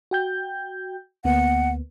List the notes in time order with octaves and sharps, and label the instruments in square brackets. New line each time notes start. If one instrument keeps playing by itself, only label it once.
[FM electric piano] F#4 G5 G6
[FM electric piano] D2 A#3 B3 [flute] F#5